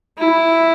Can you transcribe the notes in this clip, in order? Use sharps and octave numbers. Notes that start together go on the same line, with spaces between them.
E4